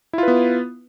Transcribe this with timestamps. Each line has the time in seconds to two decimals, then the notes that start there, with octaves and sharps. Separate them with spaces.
0.13 E4
0.18 F4
0.23 B4
0.28 B3